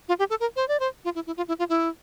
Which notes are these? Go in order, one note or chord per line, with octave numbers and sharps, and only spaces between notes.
F4
G4
A4
A#4
C5
D5
C5
F4
E4
E4
F4
E4
F4
E4